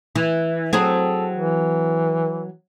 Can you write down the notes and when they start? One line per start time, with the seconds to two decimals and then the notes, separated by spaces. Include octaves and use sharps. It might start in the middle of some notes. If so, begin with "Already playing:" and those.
0.16 E3
0.73 F#3 C4 G#4 A4
1.36 E3